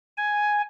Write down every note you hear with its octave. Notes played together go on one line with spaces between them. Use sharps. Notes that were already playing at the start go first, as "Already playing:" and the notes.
G#5